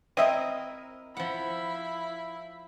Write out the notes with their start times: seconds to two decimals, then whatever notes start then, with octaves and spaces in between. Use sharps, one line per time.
0.17 C4 E4 A#4 D#5 E5 D#6
1.17 F3 E4 F#5 B5